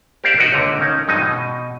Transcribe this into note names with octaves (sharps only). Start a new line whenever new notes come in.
G4 A#4 C5 D5 E5 F5
D#4 F#4 A#4 B4 D#5
C#2 A#2 D3
C#4 D#4 A#4
G2 F3 F#3 G#3 D#4
B2